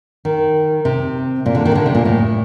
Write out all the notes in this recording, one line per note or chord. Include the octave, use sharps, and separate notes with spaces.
D#3
C3
A#2
D3
D#3
C3
D3
C3
A#2
A2